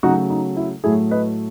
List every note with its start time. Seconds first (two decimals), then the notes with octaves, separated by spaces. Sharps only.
0.03 C#3 F#3 A3 D#4 F#4
0.30 D#4
0.57 E4
0.84 A2 F#3 A3 E4 G#4
1.11 B4 D#5